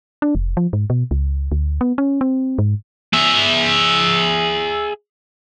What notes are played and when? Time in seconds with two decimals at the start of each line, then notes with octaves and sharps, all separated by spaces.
0.22 D4
0.35 F1
0.57 F3
0.73 G#2
0.90 B2
1.11 C#2
1.52 D2
1.81 B3
1.98 C#4
2.21 C4
2.58 G#2
3.13 G#4 E5